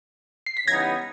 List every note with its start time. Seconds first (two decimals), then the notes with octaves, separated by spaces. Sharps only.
0.46 C7
0.57 B6
0.67 C#3 E3 G3 B3 D#4 G#6 A#6